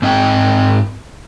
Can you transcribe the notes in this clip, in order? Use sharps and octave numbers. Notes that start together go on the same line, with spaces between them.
G#2 C4 D#5 G5